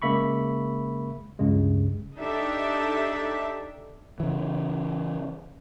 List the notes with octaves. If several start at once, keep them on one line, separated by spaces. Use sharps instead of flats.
C#3 G#3 A#3 E5 B5 C#6
C#2 G2 C#3 G#3
D4 D#4 G4 A4 E5
C#3 E3